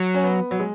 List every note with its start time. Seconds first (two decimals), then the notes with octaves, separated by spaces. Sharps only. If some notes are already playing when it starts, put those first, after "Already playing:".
Already playing: F#3
0.14 C#4
0.24 B3
0.51 F#3
0.60 G#3